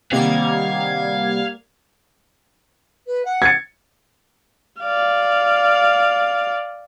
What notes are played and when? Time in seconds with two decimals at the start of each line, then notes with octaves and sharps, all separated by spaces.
0.12 C3 D#3 G3 A#3 C4 F5 F#5 G#6
3.06 B4
3.25 F#5
3.42 G#6 A6 C#7
4.82 D5 F5